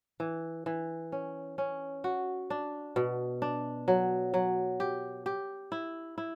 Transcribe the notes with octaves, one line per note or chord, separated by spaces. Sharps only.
E3
E3
C#4
C#4
F#4
D4
B2
D4
F#3
F#3
G4
G4
E4
E4